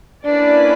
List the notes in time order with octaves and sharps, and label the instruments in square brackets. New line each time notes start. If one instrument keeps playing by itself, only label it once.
[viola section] A#3 C#4 E4 B4 D5 [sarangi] D4